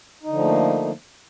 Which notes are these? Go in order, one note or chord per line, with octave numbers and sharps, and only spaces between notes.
D3 F3 A3 A#3 D#4